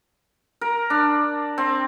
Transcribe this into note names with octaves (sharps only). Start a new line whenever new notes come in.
A#4
D4
C4